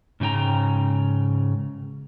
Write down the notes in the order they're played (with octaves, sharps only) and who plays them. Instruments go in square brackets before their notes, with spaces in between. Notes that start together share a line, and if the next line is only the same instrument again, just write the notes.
[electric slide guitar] G#2 C#3 D#4 G5 A#5